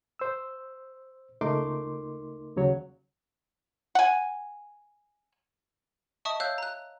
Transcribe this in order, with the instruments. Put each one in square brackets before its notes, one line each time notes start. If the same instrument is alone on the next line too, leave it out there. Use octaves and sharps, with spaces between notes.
[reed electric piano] C5 E6
C#2 A3 D#4 A#4 C6 D6
D#2 C#3 F#3 C#5
[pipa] F#5 G#5
[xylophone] D#5 E5 A5 C#6 D#6
C#5 F5 E6 F#6 G6
A#5 F#6